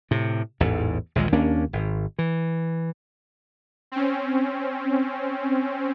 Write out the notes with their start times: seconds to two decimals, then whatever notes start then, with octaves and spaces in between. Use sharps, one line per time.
0.11 A2 C3
0.60 A1 E2 G#2
1.15 A#1 D#2 A#2 G#3
1.33 D#2 A#3 C#4 D4
1.73 G#1
2.19 E3
3.92 C4 C#4